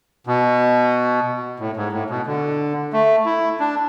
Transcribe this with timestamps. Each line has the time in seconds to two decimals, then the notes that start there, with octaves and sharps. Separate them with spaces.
0.27 B2
1.60 A2
1.77 G#2
1.92 A2
2.10 B2
2.26 D3
2.93 A3
3.26 E4
3.60 D4